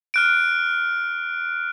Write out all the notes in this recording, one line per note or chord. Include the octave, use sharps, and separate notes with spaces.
F6 F#6 D7